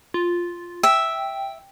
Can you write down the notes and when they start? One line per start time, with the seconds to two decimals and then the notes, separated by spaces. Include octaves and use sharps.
0.14 F4
0.83 E5 G5